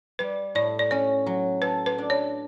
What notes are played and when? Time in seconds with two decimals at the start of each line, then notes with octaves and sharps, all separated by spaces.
0.19 G3 B4
0.55 A2 D5
0.79 D5
0.91 C#4 C#5
1.26 F#3
1.62 A4 B4
1.86 B4
1.98 D4
2.10 C#5